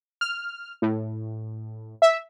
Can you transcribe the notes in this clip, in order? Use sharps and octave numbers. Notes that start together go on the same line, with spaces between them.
F6
A2
E5